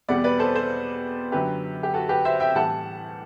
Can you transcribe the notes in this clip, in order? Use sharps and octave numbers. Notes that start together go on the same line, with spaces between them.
E2 B2 G3 D5 F#5
B4 D5
A4 C5
A4 C5
F#2 D3 F#3 G4 B4
G4
F#4 A4
G4 B4
C5 E5
E5 G5
A2 E3 G3 F#5 A5